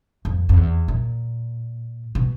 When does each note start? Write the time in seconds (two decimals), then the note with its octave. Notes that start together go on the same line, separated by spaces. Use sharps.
0.25 F2
0.49 F2
0.57 E2
0.88 A#2
2.15 B2